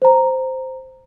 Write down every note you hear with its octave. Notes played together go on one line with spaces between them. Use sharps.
C5 A#5